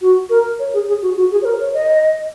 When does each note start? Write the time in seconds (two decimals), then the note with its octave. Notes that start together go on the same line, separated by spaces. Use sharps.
0.01 F#4
0.30 A#4
0.59 C#5
0.74 G#4
0.88 G#4
1.02 F#4
1.17 F#4
1.32 G#4
1.42 C#5
1.45 A#4
1.60 C#5
1.74 D#5